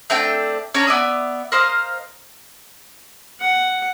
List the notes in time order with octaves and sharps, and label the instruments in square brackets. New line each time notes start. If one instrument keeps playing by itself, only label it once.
[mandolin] A3 C4 D4 G5
C#4 D4 C#5 A#5
B3 D5 E5 D#6
A#4 C5 D#5 F5
[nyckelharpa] F#5